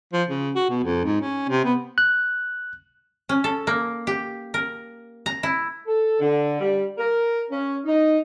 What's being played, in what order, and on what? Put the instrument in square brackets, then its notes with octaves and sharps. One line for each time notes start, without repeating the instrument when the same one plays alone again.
[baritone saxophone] F3
C#3
F#4
B2
F2
G#2
C#4
C3
B3
[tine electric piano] F#6
[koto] C#4
A4
A#3
G4
A#4
A#5
E4
[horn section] A4
D3
G3
A#4
C#4
D#4